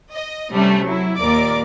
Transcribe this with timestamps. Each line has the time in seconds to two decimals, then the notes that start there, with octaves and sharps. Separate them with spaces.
0.13 D#5
0.51 C3 G3 A3 C#4
0.84 F#3 E4
1.18 D#2 A#2 A#4 D5 D6